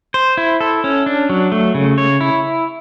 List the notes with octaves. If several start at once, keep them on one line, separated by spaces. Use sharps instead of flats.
C5
E4
A4
C#4
D4
F#3
A3
C#3
C#5
E4